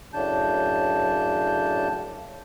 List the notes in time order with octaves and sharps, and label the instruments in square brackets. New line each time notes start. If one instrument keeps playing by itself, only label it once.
[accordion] F#2 A2 C#3 D4 A5 G6